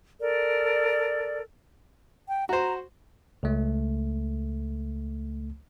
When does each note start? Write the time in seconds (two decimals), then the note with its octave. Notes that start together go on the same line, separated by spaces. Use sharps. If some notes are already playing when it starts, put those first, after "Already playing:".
0.20 A4 A#4 D5
2.28 G5
2.49 F#4 C5 A#5
3.43 C#2 A3